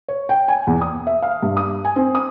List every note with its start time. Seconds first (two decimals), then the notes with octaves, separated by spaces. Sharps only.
0.08 C#5
0.29 G5
0.48 G#5
0.67 E2
0.81 D#6
1.07 E5
1.22 F5
1.43 G2
1.57 D#6
1.85 G#5
1.96 C4
2.15 D#6